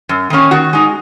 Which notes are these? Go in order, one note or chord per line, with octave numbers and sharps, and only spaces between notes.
F#2
D#3 A#3 C#4
D#3 F#4
G#3 D#4